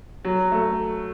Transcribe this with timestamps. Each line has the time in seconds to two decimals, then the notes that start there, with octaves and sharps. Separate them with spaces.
0.25 F#3
0.52 A3